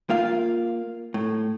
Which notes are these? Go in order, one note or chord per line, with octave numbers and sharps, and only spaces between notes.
A#3 F4 F5
A2